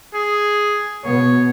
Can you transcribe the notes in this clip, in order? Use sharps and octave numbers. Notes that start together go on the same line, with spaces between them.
G#4
B2 B3 C#5